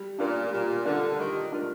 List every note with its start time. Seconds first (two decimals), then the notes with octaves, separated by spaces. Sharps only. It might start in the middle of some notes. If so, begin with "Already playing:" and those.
Already playing: G3
0.19 A#2 D4 F4 A#4
0.52 A#2 G3
0.85 D3 D4 F4 A#4
1.19 D#3 G3
1.52 D4 F4 A#4